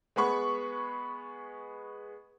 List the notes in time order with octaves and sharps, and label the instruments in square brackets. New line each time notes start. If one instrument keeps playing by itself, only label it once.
[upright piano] G#3 B3 B5 C#6